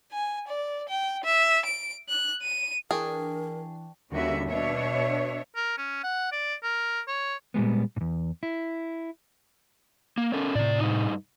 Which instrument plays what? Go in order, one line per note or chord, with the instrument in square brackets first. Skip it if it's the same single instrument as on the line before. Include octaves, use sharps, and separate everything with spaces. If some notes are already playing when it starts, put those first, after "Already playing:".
[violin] G#5
D5
G5
E5
D7
F#6
D#7
[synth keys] E3 D4 [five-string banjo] G#4 [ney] A#4 [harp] G5 A5 C#6
[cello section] D#2 D3 G3 C#4 F#4 E5
B2 D4 C#5 E5
[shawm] A#4
C#4
F#5
D5
A#4
C#5
[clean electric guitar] A#2 G3 G#3 B3
E2 G#2
E4
[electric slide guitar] A#3
C#4 A4 A#4
[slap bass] A2 C3 [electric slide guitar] C4 D5
[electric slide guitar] G2 D#4